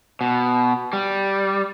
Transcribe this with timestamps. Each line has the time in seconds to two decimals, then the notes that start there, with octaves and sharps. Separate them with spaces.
0.21 B2
0.93 G3